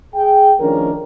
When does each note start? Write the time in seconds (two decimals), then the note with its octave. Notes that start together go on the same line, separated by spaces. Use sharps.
0.15 G#4 G5
0.60 D#3 F3 A3 C#4 D4 A#4